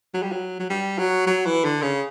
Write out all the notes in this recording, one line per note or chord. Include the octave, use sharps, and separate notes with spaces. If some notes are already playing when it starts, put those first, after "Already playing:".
F#3
G3
F#3
F#3
G3
F#3
F#3
E3
D3
C#3